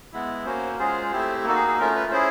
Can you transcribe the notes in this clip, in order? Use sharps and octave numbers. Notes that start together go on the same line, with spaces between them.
G#3 B3 E4
A#3 C#4 F#4 C5
G#3 C#4 F4 G#4 C5
A3 C4 E4 G4 C5
A#3 D#4 F#4 A4
G#4
G#4
A3 C#4 F4 A#4
B4
C#4 E4 G#4 C5